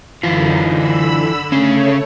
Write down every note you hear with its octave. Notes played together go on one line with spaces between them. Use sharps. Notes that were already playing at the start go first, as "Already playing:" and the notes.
F#2 D3 E3 D#4 F4
D3 B5 E6
C#3 A3 C#4 C#5